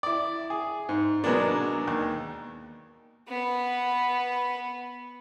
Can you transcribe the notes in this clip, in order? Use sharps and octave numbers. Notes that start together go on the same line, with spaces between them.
E4 D5
G#4
G#2
B2 F#3 G#3 A#3 B3 D4
D#2
B3 B4